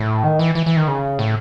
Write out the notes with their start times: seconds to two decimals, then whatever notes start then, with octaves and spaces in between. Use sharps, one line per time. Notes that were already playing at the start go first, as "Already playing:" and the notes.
Already playing: A2
0.24 D#3
0.39 E3
0.55 E3
0.66 E3
0.76 D#3
0.88 C#3
1.19 A2